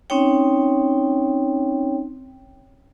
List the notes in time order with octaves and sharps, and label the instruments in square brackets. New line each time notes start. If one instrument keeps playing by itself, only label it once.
[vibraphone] C4 C#4 D#4 C#5 G5